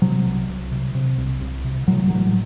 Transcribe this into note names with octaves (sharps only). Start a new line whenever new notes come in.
C3 F#3
C2
C2
C3
C3
C2
C2
C3
A2 F#3
A1 F#3